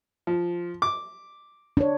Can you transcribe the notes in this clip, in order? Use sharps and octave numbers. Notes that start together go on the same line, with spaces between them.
F3
D6
D4 C#5